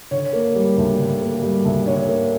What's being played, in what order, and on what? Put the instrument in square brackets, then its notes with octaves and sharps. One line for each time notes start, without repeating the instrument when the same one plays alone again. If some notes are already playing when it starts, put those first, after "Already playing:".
[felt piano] D3 C#5
A#3
G3
D2
D3
A#3
G3
D2
D3 C#5
A#3